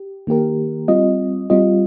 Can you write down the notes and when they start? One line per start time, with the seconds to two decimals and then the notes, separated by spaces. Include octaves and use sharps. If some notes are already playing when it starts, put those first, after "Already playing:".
Already playing: G4
0.27 D#3 A#3 G4 A#4
0.88 G3 C4 F4 D#5
1.50 G3 C4 F4 D#5